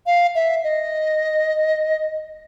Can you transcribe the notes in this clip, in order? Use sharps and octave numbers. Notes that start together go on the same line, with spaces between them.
F5
E5
D#5